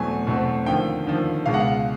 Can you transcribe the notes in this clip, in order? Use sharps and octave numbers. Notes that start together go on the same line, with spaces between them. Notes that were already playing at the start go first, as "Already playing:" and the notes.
Already playing: E2 B2 F#3 A3 C4 G#5
E2 B2 F#3 A3 C4
D#2 D3 F3 G5
D#2 D3 F3
C#2 B2 G#3 F5
F#5
F5